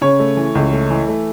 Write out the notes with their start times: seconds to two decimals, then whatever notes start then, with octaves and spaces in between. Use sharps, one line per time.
0.01 C#3 C#5
0.20 A3
0.37 E3
0.55 C#2
0.73 A3
0.90 E3
1.08 A3